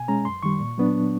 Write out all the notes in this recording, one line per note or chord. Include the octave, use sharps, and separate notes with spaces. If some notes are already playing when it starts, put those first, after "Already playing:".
Already playing: B2 G#5
G#3 C#4 A#5
F#2 C6
D#3 G3 C#6
A#2
F#3 B3 D4